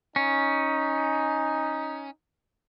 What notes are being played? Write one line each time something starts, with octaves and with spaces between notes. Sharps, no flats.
C#4 D#4